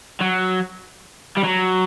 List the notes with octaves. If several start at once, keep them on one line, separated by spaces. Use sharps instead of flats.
F#3
G3
F#3